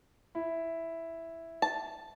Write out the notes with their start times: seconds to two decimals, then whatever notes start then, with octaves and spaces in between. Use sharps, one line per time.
0.35 E4
1.62 A5